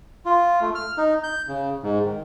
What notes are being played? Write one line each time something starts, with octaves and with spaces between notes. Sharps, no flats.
F4
A3
F6
D#4
G6
C#3
G#2
D#3